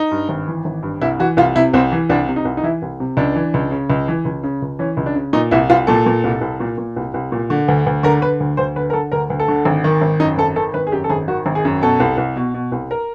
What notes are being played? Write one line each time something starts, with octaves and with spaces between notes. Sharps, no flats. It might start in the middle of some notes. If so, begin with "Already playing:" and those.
Already playing: D#4
G2
G#1
E3
G#1
G2
C2 E4
E3 F#4
C2 F4
C3 E4
C2 C4
E3
C2 D4
C3
D#4
C2
D#4
E3 E4
C2
C3
C#2 D4
E3
C#2
C#3
C#2
E3
C#2
C#3
C#2
E3 C#4
C#2
D4
C#3
A#2 D#4
C2 E4
C2 F4
A#2 A4
A#2
C2
C2
A#2
A#2
C2
C2
A#2
D3
D2
D2
D3 A#4
D3 B4
D2
D2 C5
D3 B4
A#4
D3 A4
D2 A#4
D2
A4
D3
G#1
D#3
G#1
F#2 D#4
G#1 A4
D#3 A4
G#1 B4
G#4
F#2 G4
A4
G#1 G#4
D#3 F#4
G#1
G#4
F#2
B2 A4
C2
C2
B2
B2
C2
A#4